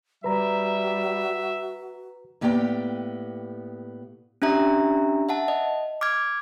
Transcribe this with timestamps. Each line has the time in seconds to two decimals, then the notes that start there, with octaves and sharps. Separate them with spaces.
0.24 G3 F#4 B4 E5 A#5
2.41 A2 A#3 B3 G4 D5 G5
4.42 C#4 D4 G4 E5 A#5
5.29 E5 F#5 A5
5.48 D#5
6.01 D6 F6 G#6